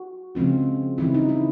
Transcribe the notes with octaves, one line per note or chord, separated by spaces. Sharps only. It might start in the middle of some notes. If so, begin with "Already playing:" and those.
Already playing: F#4
C#3 F3 G#3 C4 F4
C#3 E3 G3 C4 E4
D#4
E4